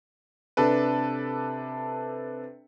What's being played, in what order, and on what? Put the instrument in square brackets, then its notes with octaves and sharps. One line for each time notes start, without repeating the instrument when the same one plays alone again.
[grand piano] C3 D4 A4 B4